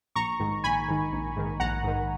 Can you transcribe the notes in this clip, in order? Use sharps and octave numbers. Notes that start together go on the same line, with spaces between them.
A#1 A#5 C#6
G#2 D#3
A#1 G#5 B5
G#2 D#3
A#1
G#2 D#3
A#1 F#5 A#5
G#2 D#3